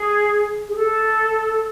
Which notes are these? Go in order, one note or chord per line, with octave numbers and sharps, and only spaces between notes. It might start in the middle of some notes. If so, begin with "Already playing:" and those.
Already playing: G#4
G#4
A4